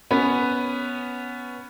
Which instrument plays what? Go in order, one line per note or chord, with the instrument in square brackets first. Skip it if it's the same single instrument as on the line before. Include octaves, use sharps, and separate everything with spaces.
[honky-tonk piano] B3 C#4 B4